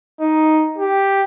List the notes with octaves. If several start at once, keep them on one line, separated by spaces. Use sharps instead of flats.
D#4
G4